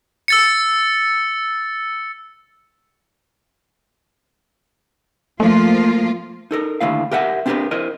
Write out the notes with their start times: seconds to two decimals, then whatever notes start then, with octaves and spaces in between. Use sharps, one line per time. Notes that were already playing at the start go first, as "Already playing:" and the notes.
0.28 E6 A6 C#7
5.40 F3 A3 A#3 F4
6.51 D#4 A4 A#4
6.81 D#2 D3 A3 E4 F5
7.11 G4 A#4 E5 F#5
7.46 C4 D4 G4 G#4 A#4 B4
7.71 E4 A#4 C5 D#5